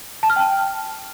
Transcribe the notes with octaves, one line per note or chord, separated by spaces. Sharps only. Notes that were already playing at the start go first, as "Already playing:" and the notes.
A5
F6
G5